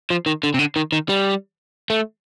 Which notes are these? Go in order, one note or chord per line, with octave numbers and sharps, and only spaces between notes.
F3
D#3
D3
C3
D3
D#3
D#3
G3
A3